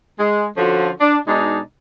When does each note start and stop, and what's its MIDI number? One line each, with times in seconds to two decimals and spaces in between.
0.20 0.47 56
0.57 0.90 50
0.57 0.90 53
0.57 0.90 61
0.57 0.90 65
0.57 0.90 66
0.57 0.90 69
1.01 1.17 62
1.28 1.59 47
1.28 1.59 56
1.28 1.59 62
1.28 1.59 63